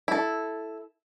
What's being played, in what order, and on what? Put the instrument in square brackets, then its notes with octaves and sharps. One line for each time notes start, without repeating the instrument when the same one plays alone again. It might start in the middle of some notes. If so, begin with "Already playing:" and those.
[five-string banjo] E4 A4